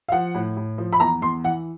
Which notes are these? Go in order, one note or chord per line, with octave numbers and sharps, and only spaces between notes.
F5
F3 F#5
A2
A2
F3
B5
E2 A#5
E2 C6
E3 F#5